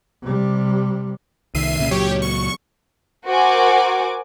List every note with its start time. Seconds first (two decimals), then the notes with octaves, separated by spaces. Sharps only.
0.22 C3 G3
1.55 C2 D#3 E5 C7 D#7
1.79 C2 A#2 C#3
1.91 C#2 A#2 F#3 G4 C#5
2.22 C#6
3.27 F#4 A#4 C5 F#5 G#5 D6